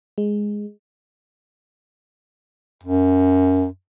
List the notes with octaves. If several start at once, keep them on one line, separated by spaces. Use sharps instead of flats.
G#3
F#2